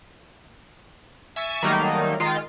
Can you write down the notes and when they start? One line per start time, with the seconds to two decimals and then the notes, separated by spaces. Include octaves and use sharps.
1.36 E5 G#5 C#6 E6 A6 D#7
1.63 D#3 F#3 G3 A3 A#3 D#4
2.20 D#3 G#3 F4